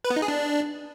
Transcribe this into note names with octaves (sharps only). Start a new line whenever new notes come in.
B4
B3
D#4
G#4
D4